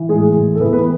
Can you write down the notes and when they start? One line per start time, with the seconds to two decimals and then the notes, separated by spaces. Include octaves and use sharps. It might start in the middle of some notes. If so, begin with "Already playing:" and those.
Already playing: E3
0.09 A2 G#3 G#4
0.35 E3
0.55 A4
0.60 E3 B3 B4
0.73 B3 B4